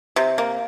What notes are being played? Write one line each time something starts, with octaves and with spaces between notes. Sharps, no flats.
C3
A#3